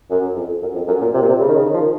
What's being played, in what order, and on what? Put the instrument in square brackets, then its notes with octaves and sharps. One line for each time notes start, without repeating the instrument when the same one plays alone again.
[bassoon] F#2
F2
F#2
F2
F#2
A#2
C3
A#2
C3
C#3
D#3
C#3
D#3
F3
D#3